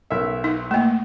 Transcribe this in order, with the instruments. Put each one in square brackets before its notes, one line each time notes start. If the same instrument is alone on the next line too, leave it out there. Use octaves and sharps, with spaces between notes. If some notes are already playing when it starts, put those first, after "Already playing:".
[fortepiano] B1 A#4 E5
[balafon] D#4
A3 A#3